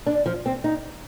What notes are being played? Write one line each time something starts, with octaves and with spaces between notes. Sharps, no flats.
D4
F3
C4
D#4